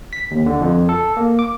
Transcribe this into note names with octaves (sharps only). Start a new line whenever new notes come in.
B6
D#2
D3
F2
A4
A#3
D6